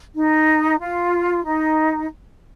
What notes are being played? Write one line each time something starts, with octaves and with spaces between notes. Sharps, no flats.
D#4
F4
D#4